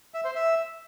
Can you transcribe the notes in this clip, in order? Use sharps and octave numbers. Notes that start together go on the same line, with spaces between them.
E5
C5
E5